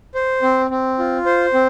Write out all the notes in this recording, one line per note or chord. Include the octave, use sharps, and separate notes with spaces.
C5
C4
C4
F4
C5
C4